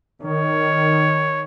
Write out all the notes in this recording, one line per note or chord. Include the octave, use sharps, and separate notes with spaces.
D#3 C#5